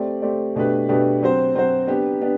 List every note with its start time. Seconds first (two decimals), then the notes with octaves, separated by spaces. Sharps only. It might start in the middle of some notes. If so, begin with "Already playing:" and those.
Already playing: A3 C4 G4 D5
0.22 A3 C4 G4 D5
0.56 B2 A3 D4 G4 B4
0.89 B2 A3 D4 G4 B4
1.23 F#3 C4 F#4 C5
1.55 F#3 C4 F#4 C5
1.88 B3 D4 G4
2.21 B3 D4 G4